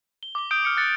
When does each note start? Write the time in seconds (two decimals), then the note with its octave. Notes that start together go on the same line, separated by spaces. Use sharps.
0.23 G7
0.35 D6 G7
0.51 D#6 G6 D7
0.65 F6 C#7
0.77 D#6 F#6 A6 C#7